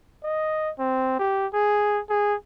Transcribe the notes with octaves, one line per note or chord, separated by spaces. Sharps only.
D#5
C4
G4
G#4
G#4